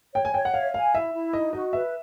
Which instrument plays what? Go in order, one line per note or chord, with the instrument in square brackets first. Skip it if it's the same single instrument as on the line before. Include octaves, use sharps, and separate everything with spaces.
[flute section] C#5 [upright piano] G5
[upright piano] G#5
[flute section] C#5 [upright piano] G5
[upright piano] F#5
[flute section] E5 [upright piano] F5
[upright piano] F5 [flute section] G#5
[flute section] E4 [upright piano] E5
[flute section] E4
[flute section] D#4 [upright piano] D#5
[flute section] F#4 [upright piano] D#5
[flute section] B4 [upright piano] E5